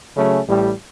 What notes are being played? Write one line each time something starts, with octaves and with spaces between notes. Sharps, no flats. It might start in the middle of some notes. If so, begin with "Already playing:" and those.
C#3 F#3 A3 C#4
A1 A2 G3